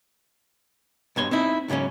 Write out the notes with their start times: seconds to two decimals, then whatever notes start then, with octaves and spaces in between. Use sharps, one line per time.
1.16 G2 B2 C#5 C6
1.31 C4 D#4 E4
1.68 C#2 G#2 C#3 F#3 C#4